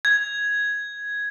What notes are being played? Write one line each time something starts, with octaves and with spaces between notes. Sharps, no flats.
G#6